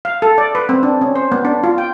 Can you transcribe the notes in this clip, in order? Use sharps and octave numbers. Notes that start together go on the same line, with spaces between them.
F5
A4
D5
B4
C4
D4
C#4
C5
B3
D4
F4
G5